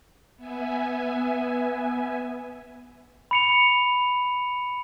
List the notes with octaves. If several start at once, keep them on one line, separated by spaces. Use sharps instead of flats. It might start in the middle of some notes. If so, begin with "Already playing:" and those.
B3 E5 G#5
B5 C#7 F7